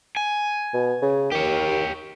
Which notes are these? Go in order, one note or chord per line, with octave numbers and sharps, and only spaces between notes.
G#5
B2
C#3
D#2 G4 C#5